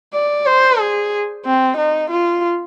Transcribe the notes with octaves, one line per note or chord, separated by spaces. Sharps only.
D5
C5
G#4
C4
D#4
F4